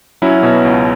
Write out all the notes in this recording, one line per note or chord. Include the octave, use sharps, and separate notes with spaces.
F#3 C#4 E4
B2
C#2